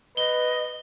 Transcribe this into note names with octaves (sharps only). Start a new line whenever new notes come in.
B4 D#5 G7